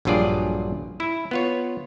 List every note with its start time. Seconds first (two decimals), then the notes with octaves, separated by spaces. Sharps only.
0.05 A#1 G2 F#3 F4 G#4 D5
1.00 E4 E5
1.31 B3 F4 C#5